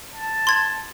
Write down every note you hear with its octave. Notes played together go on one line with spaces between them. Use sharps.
A5
C6 G#6